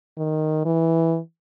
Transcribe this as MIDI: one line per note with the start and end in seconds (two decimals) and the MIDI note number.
0.17 0.61 51
0.65 1.19 52